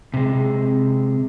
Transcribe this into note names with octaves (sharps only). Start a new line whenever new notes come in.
C3 G#3